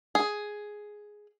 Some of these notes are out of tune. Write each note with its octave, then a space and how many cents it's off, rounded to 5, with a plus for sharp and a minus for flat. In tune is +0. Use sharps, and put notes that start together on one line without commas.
G#4 +5